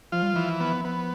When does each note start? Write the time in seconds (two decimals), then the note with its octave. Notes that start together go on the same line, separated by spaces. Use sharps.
0.12 F3 F4
0.22 G3
0.33 E3 F3
0.60 B3
0.85 B3